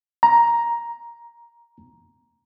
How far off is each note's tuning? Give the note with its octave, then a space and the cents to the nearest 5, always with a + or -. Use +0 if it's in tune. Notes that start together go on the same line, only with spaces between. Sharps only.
A#5 +10